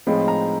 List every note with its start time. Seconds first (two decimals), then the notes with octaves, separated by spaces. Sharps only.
0.07 A2 F3 G#3 C4 D#4 B5
0.28 A#5